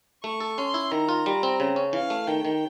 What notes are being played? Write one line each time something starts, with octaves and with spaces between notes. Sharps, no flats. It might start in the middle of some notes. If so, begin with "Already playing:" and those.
A3 C#6
A4
C#4 C6
E4
D#3 A#5
F4
G3
C4
C#3
C#4
E3 F5
A3
D#3 G5
D#3